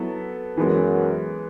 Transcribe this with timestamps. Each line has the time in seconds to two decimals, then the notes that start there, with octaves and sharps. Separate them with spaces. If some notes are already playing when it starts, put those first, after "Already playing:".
Already playing: F#3 B3 E4 A4
0.57 F#2 E3 G#3 B3